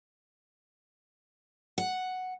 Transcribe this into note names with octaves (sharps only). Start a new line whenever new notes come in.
F#5